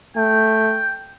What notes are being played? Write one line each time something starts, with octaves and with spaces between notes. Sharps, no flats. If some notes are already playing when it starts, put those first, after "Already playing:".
A3 G5